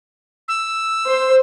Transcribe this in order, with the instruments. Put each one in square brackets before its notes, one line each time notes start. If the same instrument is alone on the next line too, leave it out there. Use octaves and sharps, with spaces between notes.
[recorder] E6
[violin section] C5